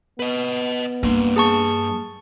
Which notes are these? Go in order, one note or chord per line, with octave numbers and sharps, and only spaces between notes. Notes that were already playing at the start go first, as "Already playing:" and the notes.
B3 B4 D#5
G2 A#3 D4 C6
G#4 A5 C#6